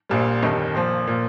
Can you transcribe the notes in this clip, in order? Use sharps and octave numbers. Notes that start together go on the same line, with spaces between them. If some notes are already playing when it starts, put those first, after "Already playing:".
A#1 A#2 G3
G1 F2 D#3 G3
A#1 A#2 F3 C5
A#2 F3